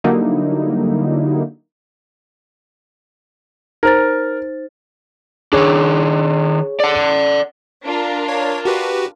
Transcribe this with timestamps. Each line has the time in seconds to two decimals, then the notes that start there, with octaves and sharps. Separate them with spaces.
0.04 D3 F#3 G3 A#3 D#4 E4
3.83 D#4 A#4 C5 A6
5.53 D#3 D4 G#4 C#5
6.80 D5 F#5
7.85 D4 F4 A#4
8.28 C#5
8.65 F#4 G4 B4